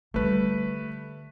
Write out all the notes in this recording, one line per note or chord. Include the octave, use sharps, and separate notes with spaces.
D3 G3 A3 B4